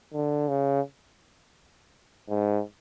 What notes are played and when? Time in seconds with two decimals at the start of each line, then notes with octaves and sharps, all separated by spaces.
0.13 D3
0.48 C#3
2.29 G#2